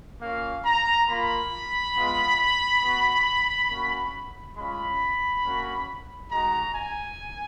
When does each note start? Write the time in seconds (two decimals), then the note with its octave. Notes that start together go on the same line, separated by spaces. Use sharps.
0.21 A#3 C#4 F4 F5
0.65 A#5
1.08 A#3 F4 B5
1.95 G#3 B3 F4
2.82 B3 F#4
3.69 A#3 C#4 F#4
4.56 G#3 C#4 F4 B5
5.43 A#3 C#4 F#4
6.30 G#3 D#4 F#4 A#5
6.74 G#5